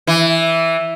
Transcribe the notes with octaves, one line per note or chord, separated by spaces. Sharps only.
E3